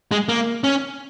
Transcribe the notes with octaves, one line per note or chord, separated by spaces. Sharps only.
G#3
A#3
C#4